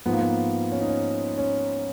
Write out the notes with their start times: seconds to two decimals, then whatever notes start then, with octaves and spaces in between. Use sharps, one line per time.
0.06 G#2 F3 B3
0.13 A#3
0.20 B3
0.72 C#4
0.80 D#4
0.88 C#4
1.38 C#4